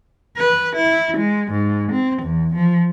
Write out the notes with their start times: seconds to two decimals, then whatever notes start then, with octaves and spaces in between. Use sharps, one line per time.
0.37 B4
0.76 E4
1.18 G#3
1.52 G#2
1.92 C4
2.22 E2
2.55 F3